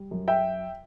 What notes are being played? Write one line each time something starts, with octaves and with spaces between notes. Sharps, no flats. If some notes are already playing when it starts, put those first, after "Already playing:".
Already playing: G3
F#2
E5 G5